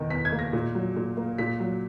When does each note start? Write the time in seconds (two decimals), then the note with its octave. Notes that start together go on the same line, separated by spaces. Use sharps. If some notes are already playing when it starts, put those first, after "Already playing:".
Already playing: E2 B2 D#3
0.10 E2 B6
0.25 G#6
0.32 A#3
0.39 A#6
0.53 A#2
0.75 F#3
0.96 A#2
1.17 A#3
1.38 A#2 B6
1.60 F#3